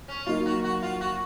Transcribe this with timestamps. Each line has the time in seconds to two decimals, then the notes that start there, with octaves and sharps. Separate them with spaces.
0.08 C#4
0.26 F#3 A#3 D#4 F4
0.46 F#4
0.64 F#4
0.82 F4
1.01 F#4